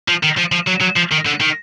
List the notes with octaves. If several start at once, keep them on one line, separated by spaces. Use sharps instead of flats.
F3
D#3
F3
F3
F#3
F#3
F3
D#3
D3
D#3